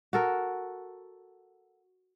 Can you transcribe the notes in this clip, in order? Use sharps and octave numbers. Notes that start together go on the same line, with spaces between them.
F#4 A4 A#4